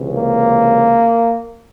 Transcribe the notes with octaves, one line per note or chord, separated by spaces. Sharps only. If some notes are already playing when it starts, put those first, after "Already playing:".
Already playing: C#2 C3 E3
A#3